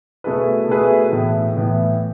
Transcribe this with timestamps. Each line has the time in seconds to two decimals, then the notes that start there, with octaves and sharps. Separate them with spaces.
0.24 B2 A3 E4 G#4 B4
0.68 B2 A3 E4 G#4 B4
1.12 A2 E3 B3
1.57 A2 E3 B3